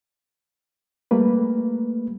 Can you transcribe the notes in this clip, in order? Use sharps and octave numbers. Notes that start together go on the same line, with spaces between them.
G3 A3 A#3 B4